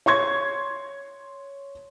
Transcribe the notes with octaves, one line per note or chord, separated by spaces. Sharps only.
C#5 C6 C#6 G#6